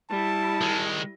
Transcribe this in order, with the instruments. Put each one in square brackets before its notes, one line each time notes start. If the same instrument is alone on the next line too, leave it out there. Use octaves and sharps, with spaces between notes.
[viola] G3 E4 [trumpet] A5
[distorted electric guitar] D#3 G#3